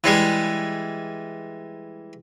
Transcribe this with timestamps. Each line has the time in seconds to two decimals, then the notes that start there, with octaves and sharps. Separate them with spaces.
0.04 E3 G3 G#3